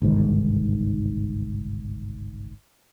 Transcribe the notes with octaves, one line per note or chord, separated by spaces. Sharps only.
G1 C2 G#2 D#3